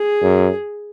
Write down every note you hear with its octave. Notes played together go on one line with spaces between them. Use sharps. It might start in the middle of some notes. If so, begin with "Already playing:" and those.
Already playing: G#4
F#2